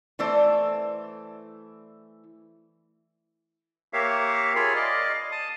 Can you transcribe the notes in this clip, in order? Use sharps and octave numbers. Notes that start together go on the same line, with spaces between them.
E3 A3 A4 C5 D5
A#3 G4 A#4 C#5 E5 F5
F4 G#4 A#4 C#5 B5
D5 D#5 F5
A5 D#6